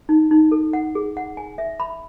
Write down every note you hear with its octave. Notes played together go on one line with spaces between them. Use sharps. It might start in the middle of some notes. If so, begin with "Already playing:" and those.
D#4
D#4
A4
F#5
G#4
F#5
G#5
E5
B5